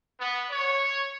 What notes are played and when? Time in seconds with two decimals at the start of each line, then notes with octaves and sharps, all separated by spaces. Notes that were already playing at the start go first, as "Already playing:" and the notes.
0.19 B3
0.50 C#5